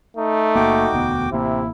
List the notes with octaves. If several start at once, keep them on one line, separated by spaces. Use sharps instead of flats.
A3 D#4
F#1 F#2 A#3 F#4 G5 D6
E1 D2 B3
A1 C3 A#3 E4